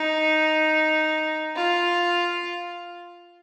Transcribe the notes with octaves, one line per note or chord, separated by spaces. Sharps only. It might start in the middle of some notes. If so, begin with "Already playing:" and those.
Already playing: D#4
F4